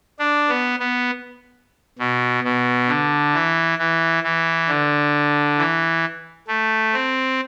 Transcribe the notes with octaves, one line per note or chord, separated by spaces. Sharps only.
D4
B3
B3
B2
B2
D3
E3
E3
E3
D3
E3
A3
C4